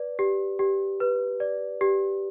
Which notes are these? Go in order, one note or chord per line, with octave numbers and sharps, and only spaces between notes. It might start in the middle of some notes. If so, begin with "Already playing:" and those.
Already playing: B4 D5
G4
G4
B4
D5
G4